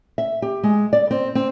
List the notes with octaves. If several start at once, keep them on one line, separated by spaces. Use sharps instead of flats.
E5
G4
G#3
D5
C4
C4